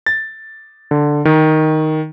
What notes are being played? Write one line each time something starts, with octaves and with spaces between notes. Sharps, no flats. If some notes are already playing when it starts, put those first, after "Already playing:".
A6
D3
D#3